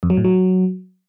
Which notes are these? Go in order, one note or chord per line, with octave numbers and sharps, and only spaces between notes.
F2
F#3
A2
F#3